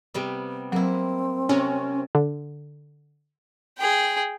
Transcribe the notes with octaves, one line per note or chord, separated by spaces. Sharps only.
C3 G3 B3
F#3 A#3 C4 E4
C3 C#4 A#5
D3
G#4 G5